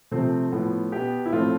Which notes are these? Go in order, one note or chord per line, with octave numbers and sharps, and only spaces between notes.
C3 F3 A3 C4
A2 F3 B3
B2 B3 G4
E4
A2 F3 A3 C4 F4